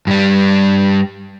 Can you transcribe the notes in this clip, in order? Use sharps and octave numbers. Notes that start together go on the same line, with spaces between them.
G2 G3